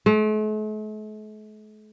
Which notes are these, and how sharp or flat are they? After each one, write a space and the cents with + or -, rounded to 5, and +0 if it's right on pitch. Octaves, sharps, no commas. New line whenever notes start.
A3 -45